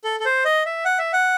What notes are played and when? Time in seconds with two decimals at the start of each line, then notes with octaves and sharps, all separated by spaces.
0.04 A4
0.20 A4
0.25 C5
0.45 D#5
0.66 E5
0.85 F#5
0.98 E5
1.13 F#5